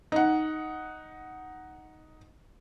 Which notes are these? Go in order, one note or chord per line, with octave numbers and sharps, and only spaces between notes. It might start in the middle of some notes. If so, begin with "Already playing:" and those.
D#4 F#5